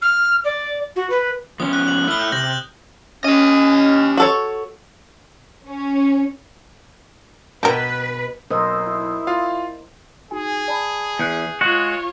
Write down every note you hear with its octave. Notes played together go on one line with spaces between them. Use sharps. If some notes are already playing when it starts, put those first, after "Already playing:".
F6
D5
F#4
B4
F3 B3 C#4 D#6
F#6
F#7
A3 E4 F6 G7
G6
C3 G6 A#6 F#7
C#4 G4 D#5
F#4 A4 C#5
C#4
B2 D4 A#4 B4 D#5 G5
B1 A#4 C5 D#5 D#6 E6
E4
F4 F5
D#4 F#4 G#4 G#5
D5 A5 B5
E2 F#6 G6
G#3 F4 F#4 C#5